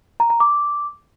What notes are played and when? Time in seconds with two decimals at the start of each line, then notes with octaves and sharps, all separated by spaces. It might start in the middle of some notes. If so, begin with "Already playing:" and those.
0.20 A#5
0.30 A#5
0.40 D6